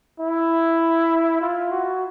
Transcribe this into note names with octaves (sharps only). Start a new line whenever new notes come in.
E4
F4
F#4